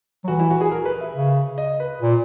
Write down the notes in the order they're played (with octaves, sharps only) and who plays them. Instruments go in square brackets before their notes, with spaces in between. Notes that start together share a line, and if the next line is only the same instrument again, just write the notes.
[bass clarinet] F#3
[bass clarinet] E3 [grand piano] F#4
[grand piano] E4
F#4
G#4
A#4
B4
E5
[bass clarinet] C#3
[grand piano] D#5
B4
[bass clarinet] A#2